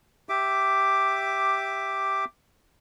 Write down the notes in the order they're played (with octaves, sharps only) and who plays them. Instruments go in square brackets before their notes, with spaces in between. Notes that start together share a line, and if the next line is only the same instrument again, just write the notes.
[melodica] G4 E5 D6